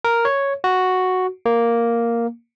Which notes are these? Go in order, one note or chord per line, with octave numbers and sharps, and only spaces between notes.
A#4
C#5
F#4
A#3